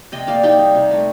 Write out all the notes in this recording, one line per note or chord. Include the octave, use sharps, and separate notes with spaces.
C3 D#5 G5
A#3 D5 F5
C3 D#4 G4
G3
C3
A3